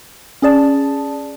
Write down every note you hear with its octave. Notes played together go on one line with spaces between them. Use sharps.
C#4 G#4 D5 A5